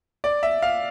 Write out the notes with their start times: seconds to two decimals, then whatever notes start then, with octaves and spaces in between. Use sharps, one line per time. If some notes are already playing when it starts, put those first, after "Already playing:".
0.24 D5
0.43 E5
0.62 F5